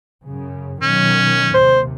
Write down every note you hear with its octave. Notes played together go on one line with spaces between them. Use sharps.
F#2 C#3
B2 D#3 F#3 C#4
D#2 C3 C5